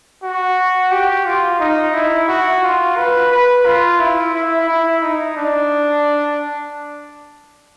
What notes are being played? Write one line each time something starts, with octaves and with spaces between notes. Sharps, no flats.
F#4
G4
F4
D#4
E4
F#4
F4
B4
B4
F4
E4
E4
E4
D#4
D4